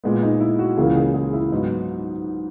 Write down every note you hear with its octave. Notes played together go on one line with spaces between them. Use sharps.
A#2 G#3 B3
D#4
E4
F#4
C#2 C#3 E3 A#3 G#4
G#4
G#4
E4
G#2 F#3 B3 D#4